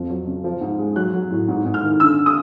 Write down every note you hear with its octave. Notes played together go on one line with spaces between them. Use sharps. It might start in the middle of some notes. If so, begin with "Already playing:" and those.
Already playing: F2 F3
F#3
C#3
F3
G#2
G#3
F#3 F#6
F#3
A2
G#2
G#2
F6
D#3
D3 E6
D#6